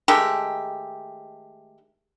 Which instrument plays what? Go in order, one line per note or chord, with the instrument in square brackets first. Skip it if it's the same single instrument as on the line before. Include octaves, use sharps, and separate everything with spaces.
[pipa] D#3 G#3 A3 G4